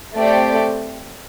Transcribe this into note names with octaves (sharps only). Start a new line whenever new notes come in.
A3 C4 G4 D5